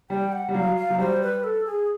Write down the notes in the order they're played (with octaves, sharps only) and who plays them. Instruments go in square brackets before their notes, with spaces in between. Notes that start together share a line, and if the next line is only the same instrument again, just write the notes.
[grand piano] G3 [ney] G5
[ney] F#5
[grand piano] G3
[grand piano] F#3 [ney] F5
[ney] F5
[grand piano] F#3
[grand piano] G3 [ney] C5
[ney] B4
A4
G#4